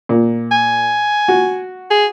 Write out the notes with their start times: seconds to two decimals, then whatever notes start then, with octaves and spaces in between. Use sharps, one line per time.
0.09 A#2
0.51 G#5
1.28 F#4
1.90 G#4